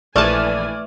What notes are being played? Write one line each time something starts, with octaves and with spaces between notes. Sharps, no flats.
A#1 E3 A3 D5 G#5 A5 F6